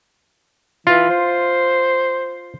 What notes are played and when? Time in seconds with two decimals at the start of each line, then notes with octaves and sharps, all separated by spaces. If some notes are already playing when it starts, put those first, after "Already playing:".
0.87 E3 F4
1.09 C5